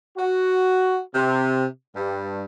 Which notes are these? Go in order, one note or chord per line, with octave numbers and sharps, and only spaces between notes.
F#4
C3
G2